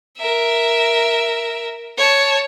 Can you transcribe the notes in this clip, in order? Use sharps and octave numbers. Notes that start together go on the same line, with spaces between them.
A#4 E5
C#5 A5